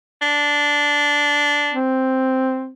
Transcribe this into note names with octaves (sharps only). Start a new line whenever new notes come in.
D4
C4